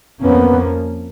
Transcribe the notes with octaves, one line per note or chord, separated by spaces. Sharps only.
F2 F3 A#3 B3 C#4